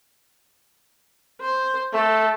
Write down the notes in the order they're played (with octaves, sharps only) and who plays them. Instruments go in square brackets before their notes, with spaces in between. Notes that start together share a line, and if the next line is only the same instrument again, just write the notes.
[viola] C5
[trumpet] A3 [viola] A4